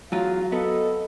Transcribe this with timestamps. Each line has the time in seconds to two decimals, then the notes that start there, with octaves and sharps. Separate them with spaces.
0.12 E2 F#3 F4 F5
0.52 B3 A4 D#5